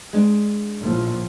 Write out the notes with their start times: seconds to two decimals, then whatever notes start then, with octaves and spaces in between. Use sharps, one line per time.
0.13 G#3 D4
0.77 A#1 A2 F3